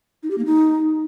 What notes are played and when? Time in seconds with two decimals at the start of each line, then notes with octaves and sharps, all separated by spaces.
0.23 D#4
0.31 G4
0.38 A#3
0.46 D#4